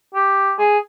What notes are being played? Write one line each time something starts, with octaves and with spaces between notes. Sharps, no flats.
G4
G#4